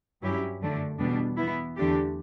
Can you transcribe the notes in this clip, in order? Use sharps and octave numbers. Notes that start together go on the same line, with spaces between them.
G2 F#3 C#4 E4 G4
F#2 D3 A3 D4
E2 B2 G3 B3 D4
E3 B3 E4
E2 D3 A3 D4 G4